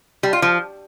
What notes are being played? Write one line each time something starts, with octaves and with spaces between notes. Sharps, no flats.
G3
F4
F3